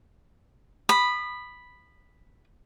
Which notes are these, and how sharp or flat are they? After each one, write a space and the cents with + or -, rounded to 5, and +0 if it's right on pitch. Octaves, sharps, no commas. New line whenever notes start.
B5 +0 D#6 -30